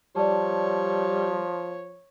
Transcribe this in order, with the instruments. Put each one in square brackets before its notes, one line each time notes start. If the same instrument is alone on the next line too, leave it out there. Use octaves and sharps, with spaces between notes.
[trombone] F3 [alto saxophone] G3 [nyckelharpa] C#5 [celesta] D5 A5